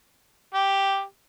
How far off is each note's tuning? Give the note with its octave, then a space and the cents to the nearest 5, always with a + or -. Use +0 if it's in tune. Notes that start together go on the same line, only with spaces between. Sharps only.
G4 +0